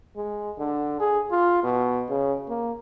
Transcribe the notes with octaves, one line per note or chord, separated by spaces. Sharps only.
G#3
D3
G#4
F4
B2
C#3
A#3